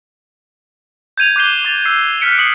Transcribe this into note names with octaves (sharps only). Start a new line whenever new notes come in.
G6 G#6 D#7 F7
D6 F#6 G6 C7 E7 G7
D6 A6 F7
E6 C7
F6 F#6 B6 C#7 D7
D#6 C7 C#7 F#7